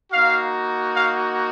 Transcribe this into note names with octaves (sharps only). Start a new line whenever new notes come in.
A#3 D#4 F#4 F5
F5